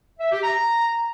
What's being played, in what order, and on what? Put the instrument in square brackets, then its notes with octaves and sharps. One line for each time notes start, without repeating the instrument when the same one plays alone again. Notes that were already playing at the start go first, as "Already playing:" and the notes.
[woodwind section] E5
G4
A#5